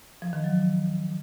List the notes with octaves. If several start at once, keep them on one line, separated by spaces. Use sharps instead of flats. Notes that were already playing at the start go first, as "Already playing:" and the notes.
F3
D#3
F#3